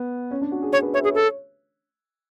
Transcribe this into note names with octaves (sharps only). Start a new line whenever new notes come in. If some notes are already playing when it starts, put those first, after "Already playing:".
Already playing: B3
C#4
D4
F#4
G#4
C#5
B4
C#5 E5
G#4 C#5
A4